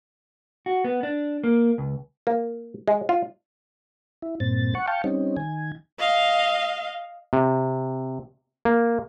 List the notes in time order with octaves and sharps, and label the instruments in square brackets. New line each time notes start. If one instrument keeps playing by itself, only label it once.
[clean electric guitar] F#4
B3
D4
A#3
C#2
[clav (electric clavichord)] A#3
G#3
F4
[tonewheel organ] E4
G2 A#2 C4 A6
F#5 C#6
F5 G5 A5 C#6
G3 C4 C#4 D#4
D#3 G#5
[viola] D#5 F5
[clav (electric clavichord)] C3
A#3